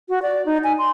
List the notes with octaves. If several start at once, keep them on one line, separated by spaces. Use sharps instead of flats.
F#4
D5
D#4
G#5
C6